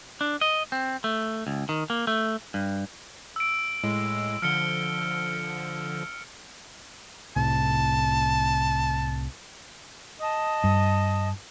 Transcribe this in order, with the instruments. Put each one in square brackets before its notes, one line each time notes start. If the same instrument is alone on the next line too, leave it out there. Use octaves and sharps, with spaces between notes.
[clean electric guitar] D4
D#5
C4
A3
C#2
D#3
A#3
A3
G2
[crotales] E6 D7
[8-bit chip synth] A2 G#3
[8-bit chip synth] D3 F3 [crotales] F6 C#7 G7
[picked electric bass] C2 A2 C3 [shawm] A5
[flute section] D#5 A5 D#6
[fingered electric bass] G2